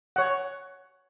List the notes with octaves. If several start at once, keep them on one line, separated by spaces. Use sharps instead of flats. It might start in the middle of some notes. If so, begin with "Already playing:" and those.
C#5 F#5